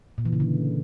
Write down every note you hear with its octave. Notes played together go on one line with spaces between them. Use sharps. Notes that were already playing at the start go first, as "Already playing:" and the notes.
A#2
E3
C#3
D3